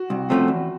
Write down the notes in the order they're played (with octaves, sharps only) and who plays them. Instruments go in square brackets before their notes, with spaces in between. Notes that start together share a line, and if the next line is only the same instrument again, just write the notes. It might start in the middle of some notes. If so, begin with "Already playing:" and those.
Already playing: [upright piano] F#4
[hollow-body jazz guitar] C2
C3 F3 A3 C#4
E2